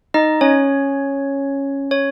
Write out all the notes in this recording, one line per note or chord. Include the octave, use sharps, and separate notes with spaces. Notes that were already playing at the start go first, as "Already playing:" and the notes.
D#4 D#5
C#4 C#5
C#5